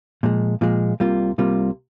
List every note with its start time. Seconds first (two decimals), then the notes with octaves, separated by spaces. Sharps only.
0.23 A#2 F3 G#3
0.61 A#2 F3 G#3
1.00 C2 C3 G3 A#3 F4
1.38 C2 C3 G3 A#3 F4